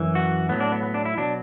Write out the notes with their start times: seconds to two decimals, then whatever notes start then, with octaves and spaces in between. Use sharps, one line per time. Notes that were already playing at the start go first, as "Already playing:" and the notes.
Already playing: F#2 E3
0.15 F#4
0.49 A2 F#3 B3
0.60 D4
0.72 B3
0.83 B3
0.94 D4
1.05 E4
1.18 B2 F#3 D4